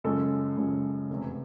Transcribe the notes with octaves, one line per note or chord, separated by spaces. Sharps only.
F#2 C#3 F3 G#3 C#4 A4
F#2 C#3 F3 G#3 C#4
F1 E2 C3